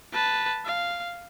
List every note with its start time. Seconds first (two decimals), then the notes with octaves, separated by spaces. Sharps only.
0.13 B4 A5
0.65 F5